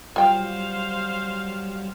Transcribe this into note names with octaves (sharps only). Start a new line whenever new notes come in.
F#3 G3 F4 C5 F5 G5